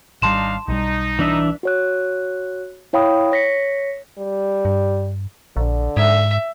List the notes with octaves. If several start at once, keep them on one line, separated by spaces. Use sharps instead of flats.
G#1 G3 D4 D#4 F5 A5 C6 E7
B1 G3 D#4
E3 D4 E5
F#4 C#5 F#6
E4 C#5 F5 G5 B5 D#6
C#5 A#6 B6 C#7
G3
G2
A#1 D3
G#2 E5